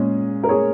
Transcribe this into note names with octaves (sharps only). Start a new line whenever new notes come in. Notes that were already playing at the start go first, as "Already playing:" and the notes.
Already playing: A#2 G#3 C#4 G#4
A#4
G#4 C#5